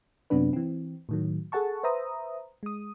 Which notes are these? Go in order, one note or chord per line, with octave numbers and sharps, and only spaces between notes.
F#2 C3 F#3 B3 D4 B4
E3 C4
A2 D#3 F#3
G#4 A4 F#5 A5 C#6
B4 C5 E5 A#5 D#6
G#3 D#6